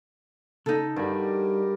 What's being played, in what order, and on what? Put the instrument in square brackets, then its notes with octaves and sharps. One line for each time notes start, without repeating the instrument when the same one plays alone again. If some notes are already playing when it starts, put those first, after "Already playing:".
[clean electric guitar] C#3 [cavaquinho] D#4 A4
[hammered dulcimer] G2 [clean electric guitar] G3 F#4 [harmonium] G4 A#4